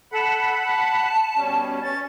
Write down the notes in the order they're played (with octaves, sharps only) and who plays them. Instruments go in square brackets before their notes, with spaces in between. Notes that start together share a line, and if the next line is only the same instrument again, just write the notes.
[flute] A4 [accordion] F#5 B5
[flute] A5
[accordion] B2 G3 C#4
[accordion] C#4 [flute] A6